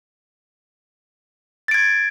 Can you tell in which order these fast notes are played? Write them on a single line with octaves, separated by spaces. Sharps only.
A6 D7 G#6